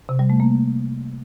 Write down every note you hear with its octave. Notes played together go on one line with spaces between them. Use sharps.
C3
G3
A3
A#3